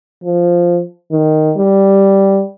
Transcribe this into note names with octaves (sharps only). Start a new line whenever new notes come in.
F3
D#3
G3